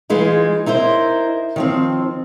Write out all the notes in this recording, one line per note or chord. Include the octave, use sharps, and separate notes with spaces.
E3 G#3 D#4 F4
D#4 E4 A#4 C5
D#3 F3 C4